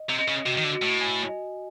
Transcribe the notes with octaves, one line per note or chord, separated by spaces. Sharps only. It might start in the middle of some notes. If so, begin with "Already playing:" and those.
Already playing: D#5
C3
D#5
C#3
C3 F#4
D#3
D3
F#4
A2
G#5
D#5